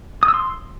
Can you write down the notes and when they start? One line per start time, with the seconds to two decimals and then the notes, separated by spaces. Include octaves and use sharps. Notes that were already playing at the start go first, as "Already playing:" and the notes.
0.23 D#6
0.28 E6
0.34 C6